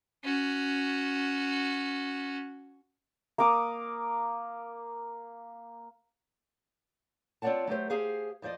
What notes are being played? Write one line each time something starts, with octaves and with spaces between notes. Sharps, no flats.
C#4 F#4
A#3 A#5 D6 D#6
C4 F4 C#5 D5 F#5 A5
F#3 A3 G4 C5
G4 G#4 C5 F5
F2 F3 C5 D5 D#5